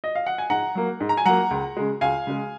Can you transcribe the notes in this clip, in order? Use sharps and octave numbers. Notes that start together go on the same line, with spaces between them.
D#5
F5
F#5
G#5
G#2 F#5 A#5
F#3 A#3
G#2
A#5
G#5
F#3 A#3 F#5 A#5
C#2
C#3 G#3
C#2 F5 G#5
C#3 G#3